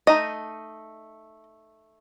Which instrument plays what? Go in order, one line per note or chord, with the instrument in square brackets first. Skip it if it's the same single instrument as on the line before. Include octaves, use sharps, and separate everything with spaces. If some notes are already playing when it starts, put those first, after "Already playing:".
[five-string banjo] A3 D#4 D#5